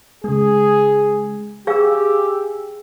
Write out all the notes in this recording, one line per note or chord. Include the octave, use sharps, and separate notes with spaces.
C#3 G#3 G#4
G4 G#4 F5 G#5 E6